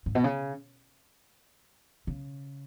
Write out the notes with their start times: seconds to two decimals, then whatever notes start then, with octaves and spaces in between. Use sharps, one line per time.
0.06 G#2
0.15 B2
0.24 C#3
2.07 C#3